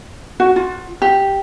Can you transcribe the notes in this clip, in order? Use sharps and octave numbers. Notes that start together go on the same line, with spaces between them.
F#4
F4
G4